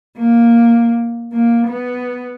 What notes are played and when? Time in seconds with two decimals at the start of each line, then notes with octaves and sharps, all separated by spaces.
0.17 A#3
1.32 A#3
1.67 B3